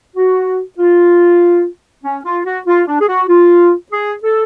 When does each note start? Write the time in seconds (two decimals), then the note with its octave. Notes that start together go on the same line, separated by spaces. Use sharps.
0.16 F#4
0.78 F4
2.04 C#4
2.24 F4
2.45 F#4
2.67 F4
2.88 D4
3.00 G#4
3.08 F#4
3.29 F4
3.91 G#4
4.24 A4